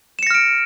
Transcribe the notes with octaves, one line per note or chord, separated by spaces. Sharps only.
F6 A#6 C#7 D7 E7